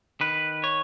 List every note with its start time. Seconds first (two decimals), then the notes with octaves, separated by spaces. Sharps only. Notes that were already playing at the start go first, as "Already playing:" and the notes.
0.21 D#3 B4
0.64 C#5